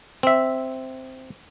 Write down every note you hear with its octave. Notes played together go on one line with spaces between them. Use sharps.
C4 E5